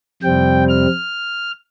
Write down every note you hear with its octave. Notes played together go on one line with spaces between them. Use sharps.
F2 C3 G3 C4 G5
F6